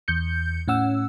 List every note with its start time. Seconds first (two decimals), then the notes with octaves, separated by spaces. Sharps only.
0.08 E2 G6 C#7
0.68 A2 C#4 F#5 E6